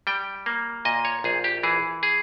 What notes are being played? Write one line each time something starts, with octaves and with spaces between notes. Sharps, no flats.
G3 G5
A#3
A#2 D#5
C#5
A#1 G#4
G4
E3 G#4
G#4